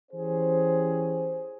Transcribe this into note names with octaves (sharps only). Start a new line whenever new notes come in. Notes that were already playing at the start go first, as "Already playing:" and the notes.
E3 C#4 G4 G#4 C5